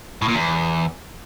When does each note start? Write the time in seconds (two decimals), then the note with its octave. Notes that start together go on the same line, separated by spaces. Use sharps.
0.22 A2
0.28 A#2
0.35 E2